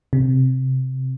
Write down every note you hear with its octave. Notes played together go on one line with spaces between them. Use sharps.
C3